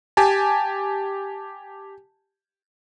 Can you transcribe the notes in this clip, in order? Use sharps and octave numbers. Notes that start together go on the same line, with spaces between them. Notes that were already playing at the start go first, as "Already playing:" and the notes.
G4 G#5 A5